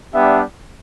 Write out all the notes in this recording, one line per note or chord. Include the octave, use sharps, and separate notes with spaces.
G3 B3 D4 G4 E5